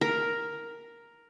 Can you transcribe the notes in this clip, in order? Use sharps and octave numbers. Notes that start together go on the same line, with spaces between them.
A#4